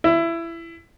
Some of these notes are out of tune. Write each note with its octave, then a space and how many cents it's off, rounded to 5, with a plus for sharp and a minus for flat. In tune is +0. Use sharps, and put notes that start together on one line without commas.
E4 +20